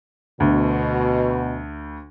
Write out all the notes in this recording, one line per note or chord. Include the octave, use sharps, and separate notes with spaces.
D2 B2